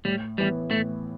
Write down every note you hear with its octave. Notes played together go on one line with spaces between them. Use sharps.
A2 G3
E3 G3 B3
A2 A3